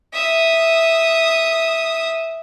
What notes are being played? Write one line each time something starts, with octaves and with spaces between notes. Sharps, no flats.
E5 D#6